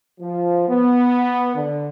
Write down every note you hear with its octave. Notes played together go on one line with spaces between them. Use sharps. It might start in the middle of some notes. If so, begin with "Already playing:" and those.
F3
B3
D3